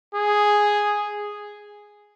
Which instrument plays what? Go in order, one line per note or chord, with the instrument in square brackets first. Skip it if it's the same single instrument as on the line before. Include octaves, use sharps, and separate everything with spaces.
[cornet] G#4